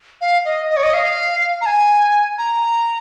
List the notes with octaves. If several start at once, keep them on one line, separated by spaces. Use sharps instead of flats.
F5
D#5
D#5
C#5
D#5
F5
A#5
G#5
A#5